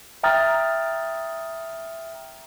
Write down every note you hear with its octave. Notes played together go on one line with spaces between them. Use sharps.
E5 G5 A#5 D#6 F6 A6